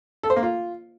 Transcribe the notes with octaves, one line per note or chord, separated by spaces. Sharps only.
A4
C5
A#3
F4